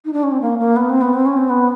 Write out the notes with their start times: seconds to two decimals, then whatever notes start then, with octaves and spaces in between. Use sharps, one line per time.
0.05 D#4
0.13 D4
0.23 C#4
0.32 C4
0.41 A#3
0.59 A#3
0.76 B3
0.89 C4
1.01 B3
1.13 C4
1.26 C#4
1.37 C4
1.49 B3